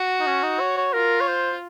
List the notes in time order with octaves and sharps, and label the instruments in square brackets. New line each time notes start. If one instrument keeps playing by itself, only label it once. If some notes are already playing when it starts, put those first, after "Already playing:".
Already playing: [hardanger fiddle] F#4
[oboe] D#4
C#4
D#4
C#5
C#5
[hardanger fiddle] F4 [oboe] A#4
[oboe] C#5
C5